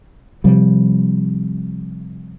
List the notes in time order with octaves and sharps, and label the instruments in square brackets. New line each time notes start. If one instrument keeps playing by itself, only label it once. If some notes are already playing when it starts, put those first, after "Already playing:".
[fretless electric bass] C3 F3 G3